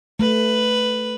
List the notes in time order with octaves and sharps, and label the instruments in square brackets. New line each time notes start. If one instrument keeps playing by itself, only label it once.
[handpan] A3 [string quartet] B4